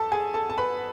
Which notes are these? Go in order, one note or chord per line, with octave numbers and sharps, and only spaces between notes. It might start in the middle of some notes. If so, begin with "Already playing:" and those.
Already playing: E2 A4 A5
G#4 G#5
A4 A5
A5
B4 B5